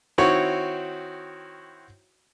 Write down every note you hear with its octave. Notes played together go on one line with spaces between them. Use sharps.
D#3 C4 E4 F#4 C#5